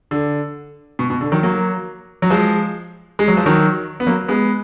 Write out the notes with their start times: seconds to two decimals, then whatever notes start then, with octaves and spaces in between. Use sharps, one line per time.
0.11 D3
0.99 B2
1.10 B2
1.21 D3
1.32 D#3 F#3
1.43 F#3 A#3
2.22 F#3
2.30 F3 G#3
3.19 G#3
3.28 F#3
3.37 F3
3.46 D#3 F#3
4.00 B3
4.07 F#3 A#3
4.28 G#3 B3